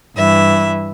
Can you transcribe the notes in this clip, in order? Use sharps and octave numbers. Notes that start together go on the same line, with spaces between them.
G2 E3 E5